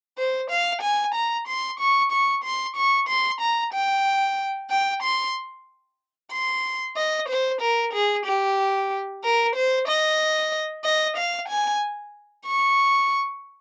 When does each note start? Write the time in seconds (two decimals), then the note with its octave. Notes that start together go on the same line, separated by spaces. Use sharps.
0.18 C5
0.50 F5
0.82 G#5
1.14 A#5
1.48 C6
1.80 C#6
2.12 C#6
2.44 C6
2.77 C#6
3.08 C6
3.41 A#5
3.74 G5
4.71 G5
5.03 C6
6.32 C6
6.97 D#5
7.29 C5
7.61 A#4
7.93 G#4
8.26 G4
9.24 A#4
9.56 C5
9.88 D#5
10.84 D#5
11.17 F5
11.49 G#5
12.46 C#6